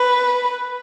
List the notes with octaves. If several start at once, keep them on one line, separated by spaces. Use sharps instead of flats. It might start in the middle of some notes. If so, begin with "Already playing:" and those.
Already playing: B4